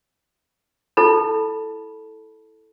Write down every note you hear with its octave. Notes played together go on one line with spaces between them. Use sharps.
E4 A4 A5 B5